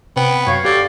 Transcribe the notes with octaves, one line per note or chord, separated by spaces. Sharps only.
C3 B3 G5
F#2 C#5 F5
D3 G4 D5